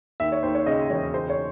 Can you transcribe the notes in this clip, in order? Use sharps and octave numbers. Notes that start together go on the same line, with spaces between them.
D#2 E5
C#5
D#2 C5
C#5
C#3 D#5
E1 C#5
C#3 C5
C#5